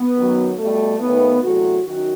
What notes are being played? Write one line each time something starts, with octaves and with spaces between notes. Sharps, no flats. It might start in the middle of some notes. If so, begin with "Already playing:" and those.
Already playing: B3
F#2 D#3 F#3
B2 G3 A3
D#2 D#3 A3 B3
E2 C3 F#3 A3 F#4
F#2 D#3 F#4